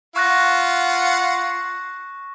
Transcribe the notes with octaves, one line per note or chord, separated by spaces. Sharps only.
F4 F#5 C#6 F#6 A#6